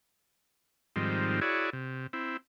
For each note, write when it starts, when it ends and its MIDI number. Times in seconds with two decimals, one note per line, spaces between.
0.96 1.40 44
0.96 1.40 51
0.96 1.40 53
0.96 1.40 55
0.96 1.40 60
1.41 1.70 64
1.41 1.70 66
1.41 1.70 68
1.41 1.70 73
1.41 1.70 74
1.73 2.07 48
2.13 2.37 60
2.13 2.37 64